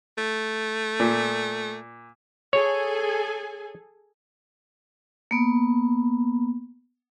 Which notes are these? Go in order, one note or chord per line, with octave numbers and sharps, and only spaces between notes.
A3
A#2
G#4 A4 C#5 G#5
A#3 B3